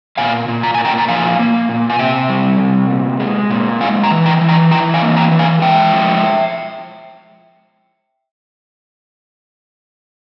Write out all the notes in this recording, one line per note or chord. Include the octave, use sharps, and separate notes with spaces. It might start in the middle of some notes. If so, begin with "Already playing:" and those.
A#2 F5 G#5
A#2
A#5
A#2 G#5
G5 A#5
A#5
F3 F5 G#5
A#3
A#2
G#5
C3 E5 G5
G3
C3
A#2
G#3
A#2
G#3 F5 G#5
G5 A#5
E3
G5 A#5
E3
G5 A#5
E3 G5 A#5
F5 G#5
A#3
G5 A#5
E3
F5 G#5
G#3 E5 G5
F3